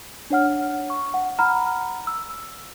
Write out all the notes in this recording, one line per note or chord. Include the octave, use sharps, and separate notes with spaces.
D4 C#5 F#5 F6
C#6
F#5
F#5 A#5 B5 F6
E6